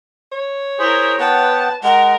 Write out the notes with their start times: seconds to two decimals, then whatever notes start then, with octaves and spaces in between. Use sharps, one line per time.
0.32 C#5
0.79 E4 G#4 A#4 C5
1.20 B3 B4 F#5 G5 A5
1.83 G#3 A#4 F#5